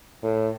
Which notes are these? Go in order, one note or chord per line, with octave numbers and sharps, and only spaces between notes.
A2